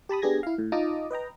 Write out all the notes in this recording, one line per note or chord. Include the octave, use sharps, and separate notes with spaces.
G4 A5 B5 D#6
B3 D4 G4 G#4 G#6 A#6
E4 F5
A2
D#4 F4 A5 A#5 D6 D#6
B4 D#5 G5 A#5